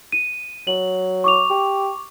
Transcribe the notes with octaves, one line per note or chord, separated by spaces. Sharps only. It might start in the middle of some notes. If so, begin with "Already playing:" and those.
D#7
F#3 F#7
C#6 D6 F7
G4